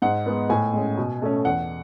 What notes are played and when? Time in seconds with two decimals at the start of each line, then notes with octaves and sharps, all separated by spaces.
0.02 G#2 F#5
0.26 G#3 B3
0.50 A2 G#5
0.73 G#3 C#4
0.97 B2
1.22 A3 C#4
1.45 E2 F#5